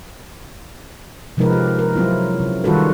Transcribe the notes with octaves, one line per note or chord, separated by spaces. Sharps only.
C3 F3 G#3 D#4 A#4 B4
G4
A#4
F#3 C4 E4 F4
C#3
D#3 G3 F4 F#4 A4 B4